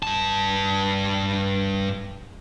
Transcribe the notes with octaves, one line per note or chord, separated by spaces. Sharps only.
G2 A5